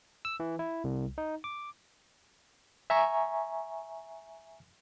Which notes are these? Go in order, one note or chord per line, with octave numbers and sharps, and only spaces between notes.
E6
E3
E4
C2
D#4
D6
E5 G#5 A#5 C#6